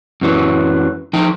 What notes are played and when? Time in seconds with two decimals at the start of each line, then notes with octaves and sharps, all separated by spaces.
0.21 F#2 E3 F#3
1.13 F3 D#4 G5